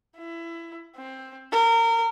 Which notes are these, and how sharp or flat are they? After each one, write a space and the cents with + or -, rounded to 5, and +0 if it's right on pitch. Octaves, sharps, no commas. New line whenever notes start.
E4 +20
C4 +10
A#4 -25